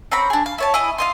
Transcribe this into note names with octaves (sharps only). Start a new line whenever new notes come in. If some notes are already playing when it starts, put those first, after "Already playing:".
C4 C#4 A#5 B5
D4 G#4
F5
E4 C#5 A5
E4 G#4 D#5
F4 D#5 C6